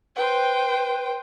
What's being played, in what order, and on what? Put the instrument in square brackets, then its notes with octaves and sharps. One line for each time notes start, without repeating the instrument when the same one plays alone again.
[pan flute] B4 [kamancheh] C5 G5